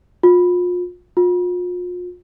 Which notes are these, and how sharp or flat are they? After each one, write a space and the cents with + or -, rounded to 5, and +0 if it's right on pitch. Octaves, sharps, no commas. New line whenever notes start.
F4 +35
F4 +40